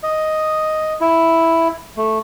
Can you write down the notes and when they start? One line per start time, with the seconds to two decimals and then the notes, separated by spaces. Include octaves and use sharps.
0.03 D#5
1.01 E4
1.97 A3